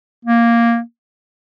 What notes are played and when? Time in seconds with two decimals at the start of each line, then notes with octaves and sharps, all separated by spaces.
0.25 A#3